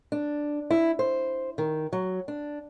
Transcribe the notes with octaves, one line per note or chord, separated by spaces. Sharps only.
D4
E4
C5
D#3
F#3
D4